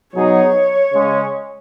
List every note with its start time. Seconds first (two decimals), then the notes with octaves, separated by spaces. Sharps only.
0.15 B2 F#3 D#4 G#4 C#5
0.93 C#3 G#3 C#4